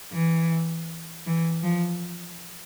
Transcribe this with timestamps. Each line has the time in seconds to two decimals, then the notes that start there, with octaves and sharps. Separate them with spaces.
0.13 E3
1.26 E3
1.63 F3